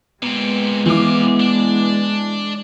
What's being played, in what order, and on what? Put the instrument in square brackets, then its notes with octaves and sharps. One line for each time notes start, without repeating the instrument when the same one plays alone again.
[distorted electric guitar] A#2 C4 [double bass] G#3 [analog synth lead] B3
[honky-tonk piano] E3 D6 [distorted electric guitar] C4 F5
[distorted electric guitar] D4